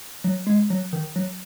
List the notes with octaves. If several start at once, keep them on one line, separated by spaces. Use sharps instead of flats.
F#3
G#3
F#3
D#3
F#3